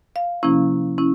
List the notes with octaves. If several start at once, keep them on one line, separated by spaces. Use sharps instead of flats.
F5
C3 F3 A#3 C#4 E4
C#4 E4